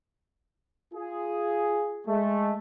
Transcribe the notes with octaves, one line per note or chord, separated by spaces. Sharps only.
F4 G#4
G#3 A3